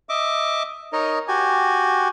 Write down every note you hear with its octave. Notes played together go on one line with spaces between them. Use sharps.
D#5 E5 D6
D#4 A#4 C#5 D#5
F#4 G4 G#5